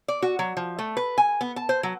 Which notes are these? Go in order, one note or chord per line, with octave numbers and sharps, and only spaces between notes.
D5
F#4
F#3
F3
A3
B4
G#5
B3
A5
C5
F#3